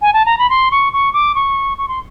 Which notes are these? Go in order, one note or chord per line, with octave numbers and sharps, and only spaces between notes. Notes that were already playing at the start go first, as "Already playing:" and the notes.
G#5
A5
A#5
B5
C6
C#6
C#6
D6
C#6
C#6
C6